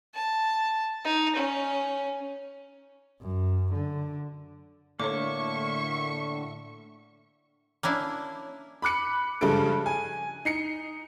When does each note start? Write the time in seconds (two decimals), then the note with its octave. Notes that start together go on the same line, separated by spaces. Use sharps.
0.14 A5
1.04 D#4
1.35 C#4
3.21 F#2
3.73 D3
5.00 A2 D3 A#3 C#5 E5 C#6 D6
7.83 A#3 C#4 D4 E4
8.82 B5 D6 F#6 C#7
9.41 G2 C#3 F3 G#3 A4 D7
9.86 G#5
10.45 D#4 C7 C#7